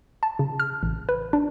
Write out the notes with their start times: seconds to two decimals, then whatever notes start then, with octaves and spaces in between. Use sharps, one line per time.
0.23 A5
0.39 C#3
0.60 F6
0.83 A1
1.09 B4
1.33 D4